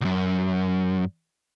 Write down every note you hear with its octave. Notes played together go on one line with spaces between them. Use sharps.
C2 F#2